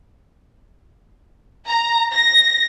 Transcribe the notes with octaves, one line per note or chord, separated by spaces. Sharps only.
A#5
A#6